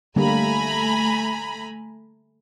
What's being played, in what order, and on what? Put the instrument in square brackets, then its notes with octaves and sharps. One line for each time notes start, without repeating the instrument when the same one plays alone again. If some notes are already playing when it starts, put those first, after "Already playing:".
[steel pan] D3 G3 A#3 [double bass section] A3 [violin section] G#5 A#5 B5